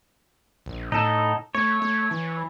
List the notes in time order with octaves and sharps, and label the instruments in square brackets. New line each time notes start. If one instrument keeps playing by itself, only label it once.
[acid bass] A#1
[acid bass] A2 [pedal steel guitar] D#4 A4
[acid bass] A3 [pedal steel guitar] C#5
[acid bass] A3
E3